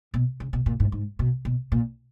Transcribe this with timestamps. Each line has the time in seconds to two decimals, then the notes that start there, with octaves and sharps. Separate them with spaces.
0.14 B2
0.40 C#3
0.53 B2
0.66 A#2
0.80 G#2
0.92 G#2
1.19 B2
1.45 B2
1.72 A#2